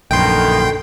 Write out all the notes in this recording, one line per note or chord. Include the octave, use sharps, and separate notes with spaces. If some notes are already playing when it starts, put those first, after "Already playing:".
A#1 F#2 B2 D3 D#3 A3 G5 C6